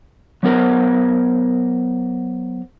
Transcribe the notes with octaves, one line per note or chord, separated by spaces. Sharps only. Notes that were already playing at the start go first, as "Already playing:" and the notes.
F#3 B3 A#4 C5